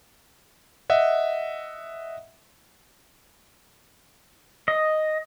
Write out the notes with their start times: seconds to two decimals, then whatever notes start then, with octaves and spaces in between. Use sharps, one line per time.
0.90 D#5 E5 F#5
4.68 D#5